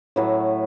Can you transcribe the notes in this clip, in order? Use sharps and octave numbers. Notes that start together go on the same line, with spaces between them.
A2 F#3 A3 B4